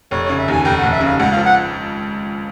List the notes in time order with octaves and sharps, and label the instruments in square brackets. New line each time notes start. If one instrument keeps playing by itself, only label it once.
[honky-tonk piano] F1 [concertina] C#5
[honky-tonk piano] C#3 [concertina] C#5
[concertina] E5
[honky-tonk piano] D#2 [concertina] G#5
[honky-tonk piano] F1 [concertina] G5
[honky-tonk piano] F1 [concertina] F#5
[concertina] E5
[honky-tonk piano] C#3 [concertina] F5
[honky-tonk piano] C#2 [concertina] F#5
[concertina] F5
[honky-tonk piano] F3
[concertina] F#5